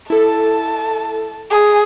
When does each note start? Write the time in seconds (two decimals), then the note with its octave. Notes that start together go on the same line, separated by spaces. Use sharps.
0.10 E4 A4 A5
1.50 G#4